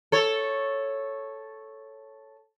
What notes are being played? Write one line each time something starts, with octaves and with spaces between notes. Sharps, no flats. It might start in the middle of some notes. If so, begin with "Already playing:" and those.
A4 C#5